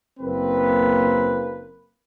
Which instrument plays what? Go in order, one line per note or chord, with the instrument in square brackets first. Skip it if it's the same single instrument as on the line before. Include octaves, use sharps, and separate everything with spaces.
[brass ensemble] F#1 A#3 C4 B4